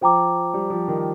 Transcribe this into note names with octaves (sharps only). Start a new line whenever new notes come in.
F3 C5 G5 A#5 D6
G3
F3
D#3